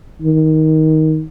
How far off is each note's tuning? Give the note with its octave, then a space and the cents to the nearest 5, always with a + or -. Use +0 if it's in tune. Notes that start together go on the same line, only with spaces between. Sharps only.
D#3 +15